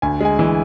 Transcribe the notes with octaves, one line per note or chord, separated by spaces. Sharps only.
D2 G#5
G#3 G#5
E3